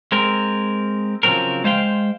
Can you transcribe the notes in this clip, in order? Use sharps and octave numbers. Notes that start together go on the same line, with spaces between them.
G#3 C4 A#4
C#3 F3 F#3 C4 A#4
G#3 C5 F5 G5